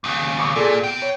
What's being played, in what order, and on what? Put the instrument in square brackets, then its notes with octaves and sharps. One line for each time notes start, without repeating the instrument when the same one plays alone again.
[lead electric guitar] D#2 C#3
[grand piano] C#6 D6
[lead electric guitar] A#2 [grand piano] G#4 A4 D5
[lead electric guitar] C3 G5 [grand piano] D7
[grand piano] C#5